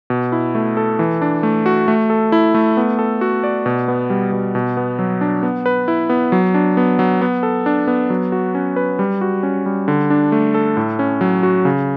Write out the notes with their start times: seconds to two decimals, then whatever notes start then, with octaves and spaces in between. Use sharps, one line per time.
0.10 B2
0.32 E4
0.55 A3
0.77 A4
0.99 E3
1.22 D4
1.43 A3
1.66 F#4
1.88 A3
2.10 A4
2.32 E4
2.54 A3
2.77 B3
2.99 A4
3.21 F#4
3.44 D5
3.66 B2
3.88 B3
4.10 G3
4.32 B2
4.55 B2
4.77 B3
4.99 F#3
5.21 D4
5.43 B3
5.66 B4
5.88 E4
6.09 B3
6.32 F#3
6.54 D4
6.77 B3
6.99 F#3
7.22 B3
7.43 A4
7.66 D4
7.87 B3
8.10 F#3
8.32 F#4
8.55 C#4
8.76 B4
8.99 G3
9.21 F#4
9.43 C#4
9.66 G3
9.88 D3
10.10 D4
10.32 A3
10.54 A4
10.77 A2
10.99 C#4
11.21 F#3
11.43 F#4
11.65 C#3